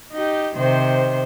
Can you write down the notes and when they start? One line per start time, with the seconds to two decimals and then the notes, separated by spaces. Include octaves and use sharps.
0.12 D#4 G4
0.56 C3 D#3 C5